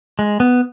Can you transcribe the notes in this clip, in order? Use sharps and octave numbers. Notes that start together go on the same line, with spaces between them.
G#3
B3